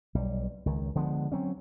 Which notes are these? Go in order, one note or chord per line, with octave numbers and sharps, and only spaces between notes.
B1 G3
C#2 D#3
D3 F3 G#3 B3
F#3 C4 C#4